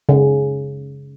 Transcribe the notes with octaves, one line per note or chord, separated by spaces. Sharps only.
C#3